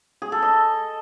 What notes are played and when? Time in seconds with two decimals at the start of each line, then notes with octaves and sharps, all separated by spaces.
0.22 G#4
0.32 A4
0.43 D#5